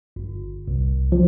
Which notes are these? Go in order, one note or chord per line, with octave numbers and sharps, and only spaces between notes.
G1
C2
F3